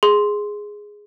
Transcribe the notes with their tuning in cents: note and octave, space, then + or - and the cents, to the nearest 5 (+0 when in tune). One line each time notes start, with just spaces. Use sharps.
G#4 +0 C6 +0